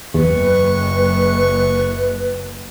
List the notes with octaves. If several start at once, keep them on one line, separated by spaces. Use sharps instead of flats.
F#1 E2 B4 C#6